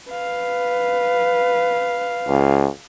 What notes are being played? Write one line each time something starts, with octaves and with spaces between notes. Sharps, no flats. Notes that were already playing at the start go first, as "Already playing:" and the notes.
B4 F5
C#2